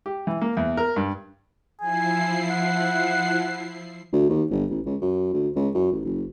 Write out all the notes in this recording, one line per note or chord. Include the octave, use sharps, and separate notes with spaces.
G4
E3
A#3
E2
A#4
G2
F3 E4 G#5 C7
F#5
D2
D#2
G1
A1
C#2
F#2
D2
C#2
F#2
A1
F#1